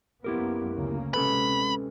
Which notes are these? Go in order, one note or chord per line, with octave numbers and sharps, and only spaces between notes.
F#2 A#3 B3 E4 G4 A#4
D2 C#3 A#3
C3 G#3 C#4 A4 B4 B5